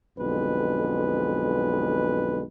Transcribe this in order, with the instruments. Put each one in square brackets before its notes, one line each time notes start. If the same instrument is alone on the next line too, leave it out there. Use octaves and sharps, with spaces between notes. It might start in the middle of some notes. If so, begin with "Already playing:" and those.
[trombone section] B1 F2 D3 G#3 B4